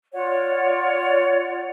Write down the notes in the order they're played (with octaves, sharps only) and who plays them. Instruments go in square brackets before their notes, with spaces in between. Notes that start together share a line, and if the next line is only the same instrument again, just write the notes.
[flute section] F4 C#5 D5 F#5